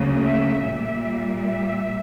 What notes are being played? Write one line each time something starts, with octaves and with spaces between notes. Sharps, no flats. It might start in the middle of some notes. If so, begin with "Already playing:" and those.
Already playing: D2 C#3 F#3 A#3
E5
A#2 G3 A#3 E5
E5